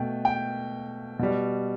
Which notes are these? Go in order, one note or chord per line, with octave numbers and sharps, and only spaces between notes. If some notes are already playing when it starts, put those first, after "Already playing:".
Already playing: B2 A3 G5
G5
B2 G3